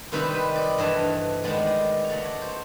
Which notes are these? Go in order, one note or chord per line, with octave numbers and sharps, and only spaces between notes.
C3 D#3 G3 C4 D#4 B4
B4
D5
G2 E3 A3 D#5
D#3 G#3 B3 D5
C#5
C#3 F#3 A3 D5
C#5
C5